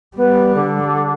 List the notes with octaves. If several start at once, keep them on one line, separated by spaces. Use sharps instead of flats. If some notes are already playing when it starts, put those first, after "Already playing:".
G3 B3
D3